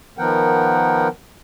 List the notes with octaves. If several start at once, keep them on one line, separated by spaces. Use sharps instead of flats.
D#3 F3 B3 A#4 F#5 G5